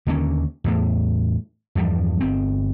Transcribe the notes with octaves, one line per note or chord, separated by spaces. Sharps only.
D#2 D3 A#3 C#4
E2 A2
E2 G2 F3 G3
G1 C4